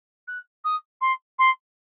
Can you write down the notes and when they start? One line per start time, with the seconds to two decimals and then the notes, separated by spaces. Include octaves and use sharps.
0.28 F#6
0.64 D#6
1.01 C6
1.39 C6